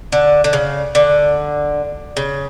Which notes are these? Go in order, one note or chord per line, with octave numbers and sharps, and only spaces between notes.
D3
D3
C#3
D3
C#3